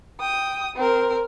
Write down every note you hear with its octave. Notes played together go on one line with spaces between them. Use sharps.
G5 D#6
C4 A#4